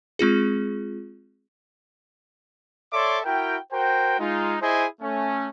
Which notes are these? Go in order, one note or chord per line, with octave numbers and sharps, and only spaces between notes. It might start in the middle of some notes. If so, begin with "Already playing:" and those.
G#3 C4 F4 G#4
A4 C#5 D5 E5 C6 D6
E4 F#4 A#4 G5
F#4 A#4 C5 G5
G#3 D#4 F4
E4 G#4 C5 D#5 G#5
A3 C#4